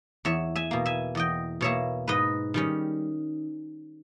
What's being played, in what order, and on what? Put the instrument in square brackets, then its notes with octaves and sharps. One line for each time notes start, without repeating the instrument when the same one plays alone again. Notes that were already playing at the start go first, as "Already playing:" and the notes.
[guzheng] E2 C#5 E5
E5 G#5
B2 A#3
E5 G#5
E2 D#5 G5
B2 A#3 C#5 E5
G#2 B4 D#5
D#3 G3 C#4